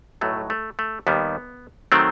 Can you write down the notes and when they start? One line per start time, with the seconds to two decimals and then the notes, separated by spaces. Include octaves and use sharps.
0.21 B1 A2 F#3 A3
0.50 A3
0.79 A3
1.07 D#2 D#3 G3 B3
1.92 D#3 F#3 A3 C4